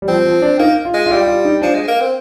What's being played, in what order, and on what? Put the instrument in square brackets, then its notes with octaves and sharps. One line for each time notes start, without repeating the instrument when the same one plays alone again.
[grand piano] G3
[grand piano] F3 [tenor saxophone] C4
[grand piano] F3
D4
[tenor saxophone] A#3 [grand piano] D#4
[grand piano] F4
[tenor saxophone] G#3
[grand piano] F4
[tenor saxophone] G3 [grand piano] G4
[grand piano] F4
D#4
[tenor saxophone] F3 [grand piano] D4
[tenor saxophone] G#3
A#3
C4